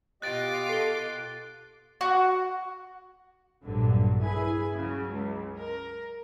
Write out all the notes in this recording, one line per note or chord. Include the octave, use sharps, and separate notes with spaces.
B2 F4 G4 D#5 D6 F#6 A6 D7
A4 C7 G7
F#4
A#1 G2 D3 F#3
E4 G#4 B4 G#5
C#3 F#3
C#2
A#4